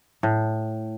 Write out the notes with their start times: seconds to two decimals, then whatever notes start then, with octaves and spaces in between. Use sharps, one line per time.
0.23 A2